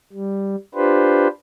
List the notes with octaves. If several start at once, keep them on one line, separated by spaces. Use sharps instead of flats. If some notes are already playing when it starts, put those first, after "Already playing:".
G3
D4 F4 G4 B4 C5